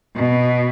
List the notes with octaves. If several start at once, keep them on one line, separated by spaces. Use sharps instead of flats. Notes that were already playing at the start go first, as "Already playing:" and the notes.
B2